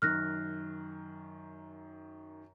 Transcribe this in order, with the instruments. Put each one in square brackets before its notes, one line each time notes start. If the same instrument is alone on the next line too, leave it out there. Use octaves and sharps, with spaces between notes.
[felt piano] F#2 D#3 [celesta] F6 F#6 A#6